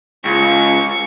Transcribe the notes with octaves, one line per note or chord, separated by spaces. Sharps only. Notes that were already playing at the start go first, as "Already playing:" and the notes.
C#2 C#6